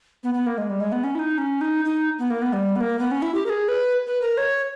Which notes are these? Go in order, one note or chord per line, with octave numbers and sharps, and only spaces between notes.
B3
B3
A#3
G#3
G3
G#3
B3
C#4
E4
D#4
C#4
D#4
D#4
B3
A#3
B3
G3
B3
A#3
B3
C#4
E4
G4
A#4
G#4
B4
B4
A#4
C#5